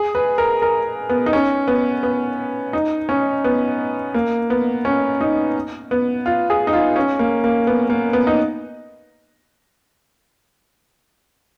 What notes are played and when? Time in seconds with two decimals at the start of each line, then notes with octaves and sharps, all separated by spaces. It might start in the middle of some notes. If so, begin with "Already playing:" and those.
Already playing: G#4
0.15 B4
0.38 A#4
0.62 A#4
1.09 B3
1.26 D#4
1.33 C#4
1.68 B3
2.03 B3
2.73 D#4
3.09 C#4
3.44 B3
4.14 A#3
4.50 B3
4.85 C#4
5.21 D#4
5.91 B3
6.26 F4
6.50 G#4
6.67 D#4
6.73 F4
6.96 C#4
7.19 A#3
7.44 A#3
7.67 B3
7.90 A#3
8.13 B3
8.27 D#4